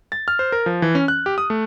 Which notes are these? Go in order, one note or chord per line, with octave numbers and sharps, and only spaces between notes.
A6
F6
C5
A#4
F3
E3
C#4
F#6
G4
D#6
A3